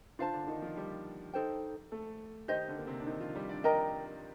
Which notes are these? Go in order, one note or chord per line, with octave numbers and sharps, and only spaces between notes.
D3 D4 F4 C5 F5 A5
D3 D4
D4
D#3 D#4
F3 F4
G3 G4
D#4 A4 C5 G5
A3 A4
D#3 D#4 G4 C5 D#5
D3 D4
A#3
C3 C4
D4
D#3 D#4
F3 F4
G3 G4
D4 D5
A#4 D#5 G5 A#5